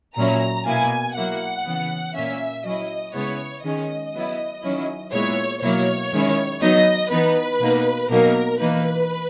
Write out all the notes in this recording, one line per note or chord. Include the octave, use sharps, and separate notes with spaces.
A#2 F#3 C#4 E4 A#5
B2 A#3 E4 G#5
F#3 A#3 E4 F#5
C#3 E3 B3
A#2 A#3 C#4 E5
F#3 C#4 E4 D#5
C#3 G#3 B3 E4 C#5
D#3 G#3 C#4 D#5
F#3 B3 E4
D#3 F#3 C#4 E4
A#2 G#3 B3 E4 C#5
B2 F#3 A#3 E4 C#5
D#3 G#3 C#4 E4
F#3 B3 D#4 D#5
E3 B3 D#4 B4
B2 A#3 D#4
B2 F#3 A#3 D#4 A#4
E3 A#3 D#4 B4